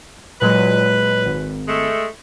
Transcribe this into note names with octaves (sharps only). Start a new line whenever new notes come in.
A#2 F#3 G#3 B4
G#1
G#3 A3